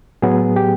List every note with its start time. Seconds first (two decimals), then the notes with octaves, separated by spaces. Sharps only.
0.22 A2 F#3 B3 G#4
0.56 G4